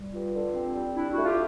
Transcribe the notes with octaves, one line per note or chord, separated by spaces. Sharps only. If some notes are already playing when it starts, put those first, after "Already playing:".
Already playing: G3
G2 F4
D3
C4
G3
D4 E4
E4 F#4
A3
F4 G4